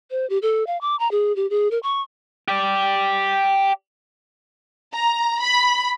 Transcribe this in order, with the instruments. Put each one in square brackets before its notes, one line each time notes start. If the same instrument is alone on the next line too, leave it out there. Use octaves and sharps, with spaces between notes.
[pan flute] C5
G4
A4
F5
D6
A#5
G#4
G4
G#4
A#4
C#6
[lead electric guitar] G4 D5
[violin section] A#5
B5